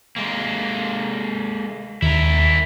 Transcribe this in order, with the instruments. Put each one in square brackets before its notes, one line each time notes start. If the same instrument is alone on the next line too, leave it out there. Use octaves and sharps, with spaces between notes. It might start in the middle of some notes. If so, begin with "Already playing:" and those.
[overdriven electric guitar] G#3 A#3
[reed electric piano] D#2 [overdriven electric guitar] E4 A#4